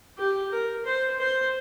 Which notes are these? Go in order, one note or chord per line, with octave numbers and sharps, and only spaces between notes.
G4
A#4
C5
C5